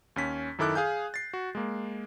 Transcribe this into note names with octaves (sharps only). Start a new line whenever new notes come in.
D#2 C#4 B6
F#2 D#3 E4 A4 D6 F#6
G#4 F5 G#5 G6
A6 C7
F#4
G#3 A#3